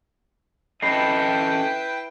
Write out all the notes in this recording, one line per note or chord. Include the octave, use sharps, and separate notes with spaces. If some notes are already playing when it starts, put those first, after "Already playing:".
C#4 E4 A4 B4 D#5 G5 B5 C7